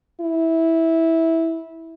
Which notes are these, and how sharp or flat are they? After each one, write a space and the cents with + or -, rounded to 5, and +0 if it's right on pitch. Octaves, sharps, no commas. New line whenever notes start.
E4 -10